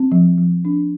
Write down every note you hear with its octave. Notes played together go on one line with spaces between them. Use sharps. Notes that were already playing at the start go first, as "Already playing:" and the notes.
Already playing: C4
F3
F3
D4